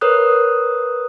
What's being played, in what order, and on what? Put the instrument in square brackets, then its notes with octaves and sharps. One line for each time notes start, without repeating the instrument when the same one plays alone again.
[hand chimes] A#4 B4 C#5 D#6 F#6